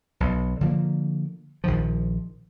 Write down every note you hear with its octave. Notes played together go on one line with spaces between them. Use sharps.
B1
D3 F3 A#3
A#1 D#3 F3